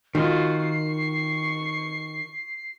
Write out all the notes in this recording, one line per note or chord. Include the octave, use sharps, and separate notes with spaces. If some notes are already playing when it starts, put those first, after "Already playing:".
D#3 F4 F#4 C7
C#6